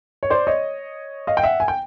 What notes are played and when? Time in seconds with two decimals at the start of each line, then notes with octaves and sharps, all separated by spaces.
0.23 C#5
0.30 C5 D5
0.47 C#5 D#5
1.27 D#5 F5
1.37 G5
1.43 E5 F#5
1.60 G#5
1.68 G5